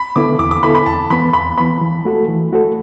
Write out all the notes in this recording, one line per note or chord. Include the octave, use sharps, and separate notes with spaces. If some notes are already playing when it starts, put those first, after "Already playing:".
Already playing: B5
D3 B3 E4 A4 D6
E2 D6
D6
D3 B3 E4 A4 B5
B5
E2 A5
E3 B3 B5
E2 B5
E3 B3 B5
E3
A3 F#4 A4
E3
A3 F#4 A4